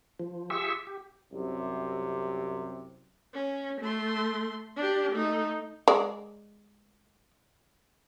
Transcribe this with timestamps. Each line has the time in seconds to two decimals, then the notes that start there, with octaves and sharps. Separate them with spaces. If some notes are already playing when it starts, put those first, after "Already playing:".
0.19 F3
0.50 F4 G4 G#4 E5 C#6 E6
0.87 G4
1.32 C2 F#2 C3
3.34 C#4
3.81 A3 C6
4.77 D4 G4
5.12 A3 D#4
5.88 G#3 D5